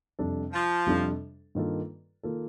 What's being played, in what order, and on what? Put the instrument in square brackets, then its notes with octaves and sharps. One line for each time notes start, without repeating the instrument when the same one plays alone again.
[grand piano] F2 C3 G3 D4 A4
[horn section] F3
[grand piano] F2 C3 G3 D4 A4
G2 D#3 A#3 F4 A4
D#3 A#3 F4 A4